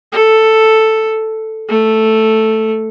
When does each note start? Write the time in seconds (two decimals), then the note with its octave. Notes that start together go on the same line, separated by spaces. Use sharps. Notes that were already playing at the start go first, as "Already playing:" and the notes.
0.13 A4
1.69 A3